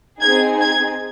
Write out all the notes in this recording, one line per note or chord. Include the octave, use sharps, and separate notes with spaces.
C4 D#4 G#4 G#6
G#6